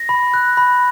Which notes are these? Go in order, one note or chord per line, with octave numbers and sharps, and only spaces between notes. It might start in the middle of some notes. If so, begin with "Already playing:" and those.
Already playing: A#6
B5
F#6
B5